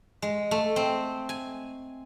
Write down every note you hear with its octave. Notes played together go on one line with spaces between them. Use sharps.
G#3
A3
C4
G#5